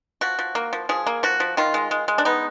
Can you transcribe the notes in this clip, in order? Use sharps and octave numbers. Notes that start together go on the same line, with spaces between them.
F3 F#4
F3
A#3
F3
F3 G#4
A#3
F3 F#4
F3
D#3 F4
G#3
G#3
G#3
D4
B3 D#4